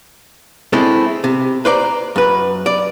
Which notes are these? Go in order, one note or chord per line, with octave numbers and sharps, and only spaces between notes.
G#3 A3 C4 D4 E4
C3
B4 C5 D5 A#5
F#2 B4
D5